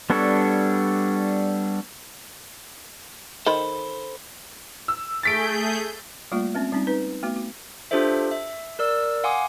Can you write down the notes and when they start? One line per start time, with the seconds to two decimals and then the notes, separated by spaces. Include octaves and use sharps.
0.10 G3 B3 D4 A4 C#5
3.46 D#3 A4 C5 B5
4.88 E6
5.23 A3 G#4 G6 A6 B6 D7
6.32 G3 A3 A#3 F4
6.55 G#3 C4 C#4
6.72 G3 C4 C#4 D#4
6.87 D#4 B4
7.23 A3 B3 F#4
7.36 F#4
7.91 D4 F4 G4 A4 C5 E5
8.31 E5
8.79 A#4 D5 E6
9.24 F5 F#5 G#5 C6 D6 D#6